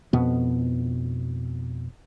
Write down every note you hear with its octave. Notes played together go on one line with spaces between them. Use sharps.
F2 B2 B3